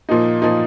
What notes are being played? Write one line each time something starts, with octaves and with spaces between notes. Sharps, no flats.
A#2 F3 A#3 D#4
A#2 F3 A#3 D#4